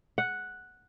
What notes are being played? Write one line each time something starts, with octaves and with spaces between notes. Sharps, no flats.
F#5